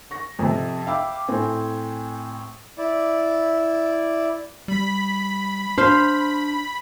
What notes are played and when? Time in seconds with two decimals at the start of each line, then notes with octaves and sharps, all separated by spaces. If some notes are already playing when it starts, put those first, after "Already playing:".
0.11 C#6 A#6
0.39 F2 C3
0.87 E5 F5 G5 B5 D6 E6
1.28 A2 C4 G#5
2.78 E4 D5
4.68 G3 B5
5.78 D4 C5 F5